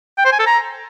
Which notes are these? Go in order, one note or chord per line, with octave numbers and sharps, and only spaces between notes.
G5
C5
G#5
A4
A#5